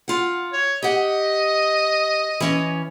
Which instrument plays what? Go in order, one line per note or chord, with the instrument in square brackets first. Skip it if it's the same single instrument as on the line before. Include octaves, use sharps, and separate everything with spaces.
[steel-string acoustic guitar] F4 F#5
[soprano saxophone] C#5
[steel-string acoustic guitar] G4 F#5 [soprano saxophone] D#5
[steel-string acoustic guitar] E3 C#4